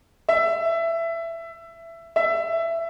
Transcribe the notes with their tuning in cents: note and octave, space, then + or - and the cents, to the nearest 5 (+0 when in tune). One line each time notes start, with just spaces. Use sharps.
E5 +15
E5 +15